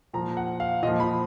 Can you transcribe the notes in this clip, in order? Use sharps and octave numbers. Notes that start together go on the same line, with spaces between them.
A#2 F3 A#5
F#5
F5
A#2 F3 D#5
B5